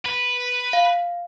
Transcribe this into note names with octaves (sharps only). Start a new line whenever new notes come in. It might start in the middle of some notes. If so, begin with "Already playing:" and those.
B4
F5